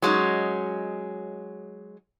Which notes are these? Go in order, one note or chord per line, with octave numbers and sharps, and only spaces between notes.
F#3 G#3 C#4 D#4